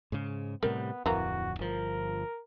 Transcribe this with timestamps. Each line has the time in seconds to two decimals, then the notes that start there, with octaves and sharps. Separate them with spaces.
0.12 G#2 C#3
0.63 A2 C3 G3 B3 A#4
1.06 D1 F2 E3 A#3 F#4 A#5
1.59 G1 F3 A#4